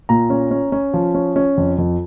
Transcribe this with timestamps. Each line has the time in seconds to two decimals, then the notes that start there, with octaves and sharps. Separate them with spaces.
0.09 A#2 A#5
0.30 C#4
0.51 C#4
0.72 C#4
0.94 F3
1.15 C#4
1.36 C#4
1.58 F2
1.78 F2